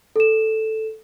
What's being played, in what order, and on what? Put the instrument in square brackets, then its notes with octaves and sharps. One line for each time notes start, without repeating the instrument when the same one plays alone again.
[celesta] A4 E7